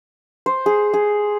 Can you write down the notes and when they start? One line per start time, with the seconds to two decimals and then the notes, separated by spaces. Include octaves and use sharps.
0.46 C5
0.66 G#4
0.93 G#4